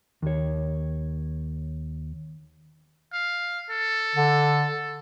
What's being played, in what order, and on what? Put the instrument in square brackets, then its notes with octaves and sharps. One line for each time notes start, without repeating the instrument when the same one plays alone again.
[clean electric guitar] D#2 C#5
[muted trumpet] F5
A4
[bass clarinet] D3